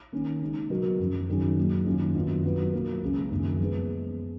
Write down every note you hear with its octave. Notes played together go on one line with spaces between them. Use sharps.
D#3 A#3 C#4
C#3 G#3 D#4
B2 F#3 B3 F#4 A#4
F#2 C#3 F3
F#2 D#3 F#3 C#4 G#4
A#2 F#3 A#3
F#2 D#3 A#3 C#4 F4
F#2 D#3 F#3 B3 F4
D#3 F#3 B3 F4
B2 F#3 A#3
C#2 C#3 G#3
F#2 D#3 A#3 C#4 G#4
F3 G#3 B3